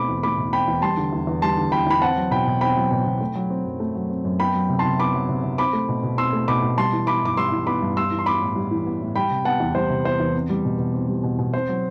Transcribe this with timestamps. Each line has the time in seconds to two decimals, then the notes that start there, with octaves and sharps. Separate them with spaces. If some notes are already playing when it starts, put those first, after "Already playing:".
Already playing: B2 A3 C4 B5 D6
0.09 E2
0.23 A3 B5 D6
0.38 B2
0.53 C4 G5 B5
0.68 E2
0.82 G3 A5 C6
0.97 D3
1.13 E2
1.27 E2
1.42 G3 A5 C6
1.57 D3
1.72 E2 G5 B5
1.87 E2 B5
2.02 C4 F#5 A5
2.17 F#3
2.31 B2 G5 B5
2.46 B2
2.61 C4 G5 B5
2.76 F#3
2.91 B2
3.06 B2
3.21 A3
3.35 F#3
3.50 C4
3.65 F#2
3.80 A3
3.95 F#3
4.10 C4
4.25 F#2
4.40 B3 G5 B5
4.55 F#3
4.69 C3
4.79 A5 C6
4.85 C3
4.99 B3 B5 D6
5.14 F#3
5.29 C3
5.44 C3
5.58 C4 B5 D6
5.73 A3
5.89 B2
6.03 B2
6.18 C4 C6 E6
6.33 A3
6.48 B2 B5 D6
6.63 B2
6.78 G3 A5 C6
6.93 E3
7.07 B3 B5 D6
7.22 G2 D6
7.37 G3 C6 E6
7.52 E3
7.67 B3 B5 D6
7.82 G2
7.97 G3 C6 E6
8.11 E3
8.19 C6
8.26 B3 B5 D6
8.41 A2
8.56 G3
8.71 E3
8.86 B3
9.01 A2
9.16 G3 G5 B5
9.30 C3
9.45 B3 F#5 A5
9.60 E2
9.75 G3 C5
9.90 C3
10.05 B3 C5
10.20 E2
10.35 C4
10.50 G3
10.65 B2
10.79 B2
10.94 C4
11.09 G3
11.23 B2
11.39 B2
11.53 C4 C5
11.69 F#3